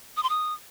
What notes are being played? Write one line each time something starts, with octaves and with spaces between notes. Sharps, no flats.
D#6
C6
D#6